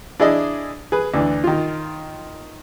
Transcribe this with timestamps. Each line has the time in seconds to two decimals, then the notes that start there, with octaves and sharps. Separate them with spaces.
0.20 D4 E4 G#4 D5 D#5
0.92 G#4 B4
1.14 D2 E3 D4
1.44 D#3 F4